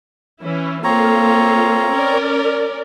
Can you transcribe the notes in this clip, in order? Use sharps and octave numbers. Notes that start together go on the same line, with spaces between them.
E3 C#4 E4
A#3 C4 F4 A4 C#5 A#5
C#4 A#4 D5